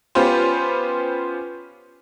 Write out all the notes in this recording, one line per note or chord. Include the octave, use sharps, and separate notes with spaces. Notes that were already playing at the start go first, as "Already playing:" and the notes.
B3 C#4 F4 G4 B4 C5